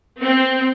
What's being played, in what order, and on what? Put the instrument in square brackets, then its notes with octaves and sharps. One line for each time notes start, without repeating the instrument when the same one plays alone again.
[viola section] C4